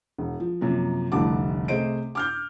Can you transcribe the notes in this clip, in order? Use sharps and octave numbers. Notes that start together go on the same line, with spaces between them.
E1
F3
F#2 C3 F3 A#3
F1 C2 D3 A3 A5 D6
C3 A3 G#4 C5 D#5 D7
D6 F6 G6